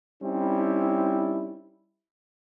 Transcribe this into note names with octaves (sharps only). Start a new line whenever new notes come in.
G3 C4 C#4 D#4 E4